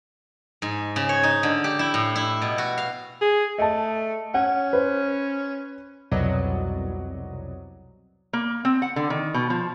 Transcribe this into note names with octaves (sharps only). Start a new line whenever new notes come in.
G#2
C#3
C#5
D#4
D3
G4
E4
A2
E4
B2
F#4
F5
G#4
A3 D#5 A5
C#4 F#5
B4 C5
C2 F2 B2 F#3 D5 D#5
A#3
C4
F#5
D3
D#3
B2
F3